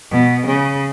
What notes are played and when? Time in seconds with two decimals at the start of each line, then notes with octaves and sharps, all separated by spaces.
0.11 B2
0.46 C#3